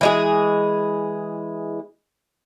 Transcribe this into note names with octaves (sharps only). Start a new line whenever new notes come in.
E3 G#3 G#4